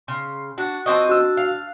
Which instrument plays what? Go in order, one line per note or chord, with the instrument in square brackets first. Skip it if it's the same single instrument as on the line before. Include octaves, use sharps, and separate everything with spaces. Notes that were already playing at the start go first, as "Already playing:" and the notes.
[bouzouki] C#3 [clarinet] C6
[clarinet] D4 [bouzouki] F#4
[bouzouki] F3 C4 D#5 [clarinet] F#4
[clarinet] D4 [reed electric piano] F#4 E6
[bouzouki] F5